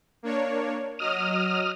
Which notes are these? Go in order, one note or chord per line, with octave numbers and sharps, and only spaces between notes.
A#3 D4 C#5
F#3 D#5 D#6 F6